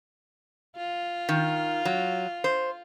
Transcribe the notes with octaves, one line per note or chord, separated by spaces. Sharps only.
F4
D#3
F#3
C5